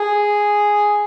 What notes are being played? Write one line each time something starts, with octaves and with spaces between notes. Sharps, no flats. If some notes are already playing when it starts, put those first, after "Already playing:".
Already playing: G#4